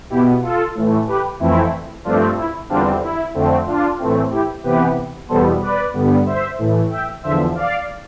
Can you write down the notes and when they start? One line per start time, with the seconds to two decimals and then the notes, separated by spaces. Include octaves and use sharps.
0.10 B2 B3 E4 G4
0.43 F4 A4
0.75 A2 E3 A3
1.07 G4 B4
1.40 F2 E3 A3 C4 E4
2.04 G2 F3 A3 C4 D4 F4
2.37 E4
2.69 E2 D3 G3 C4 D4 F4
3.02 E4
3.34 F2 D3 A3 C4
3.67 D4 F4
3.99 A2 E3 A3 C4
4.31 E4 G4
4.64 C3 E3 B3 G4 B4
5.29 E2 B2 G3 B3 A4 C5
5.61 B4 D5
5.94 G2 D3 G3 B3
6.26 C5 E5
6.58 A2 E3 A3
6.90 E5 G5
7.23 E2 D3 F3 C5 E5
7.55 D5 F5